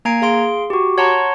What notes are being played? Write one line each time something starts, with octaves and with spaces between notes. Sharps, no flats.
A#3 G#5 A#5 G#6 C7 D7
G#4 F5 C6 D7
F#4 G4
C#5 F#5 A5 A#5 C6 C#6